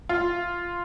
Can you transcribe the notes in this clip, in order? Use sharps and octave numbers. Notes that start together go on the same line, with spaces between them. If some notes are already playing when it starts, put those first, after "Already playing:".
F4